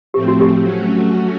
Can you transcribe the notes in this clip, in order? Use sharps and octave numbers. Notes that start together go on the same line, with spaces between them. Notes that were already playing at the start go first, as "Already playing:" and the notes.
A2 F3 A3 C4 G4
F#4
G4
F#3 A3 C#4 F#4